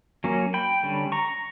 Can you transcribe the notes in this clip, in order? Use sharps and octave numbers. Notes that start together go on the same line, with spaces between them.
F#3 A#3 C#4
G5 B5
D3 G3 C#4
A#5 C#6